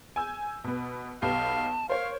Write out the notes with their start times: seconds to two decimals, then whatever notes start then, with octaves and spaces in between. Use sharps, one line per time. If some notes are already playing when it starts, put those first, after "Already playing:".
0.16 G#5 E6 G6
0.64 B2 B3
1.22 B1 B3 G4 F5 A5
1.89 A#4 C5 C#5 F5